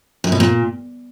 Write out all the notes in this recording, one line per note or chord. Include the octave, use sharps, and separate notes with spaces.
F#2
B2
A#2